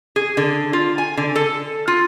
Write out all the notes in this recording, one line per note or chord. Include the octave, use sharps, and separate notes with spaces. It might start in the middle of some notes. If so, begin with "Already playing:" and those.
G#4
D3
F4
G#5
D3
A4
F4